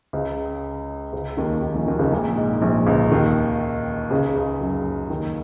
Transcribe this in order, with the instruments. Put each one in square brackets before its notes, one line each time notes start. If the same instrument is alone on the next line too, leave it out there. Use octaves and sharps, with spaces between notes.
[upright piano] C#2 C#3
C#2 C#3
D#2 D#3
D#2 D#3
A#1 A#2
D#2 D#3
C#2 C#3
A#1 A#2
G#2
A#1 A#2
C#2 C#3
D#2 D#3
C#2 C#3
C#2 C#3
F#2 F#3
D#2 D#3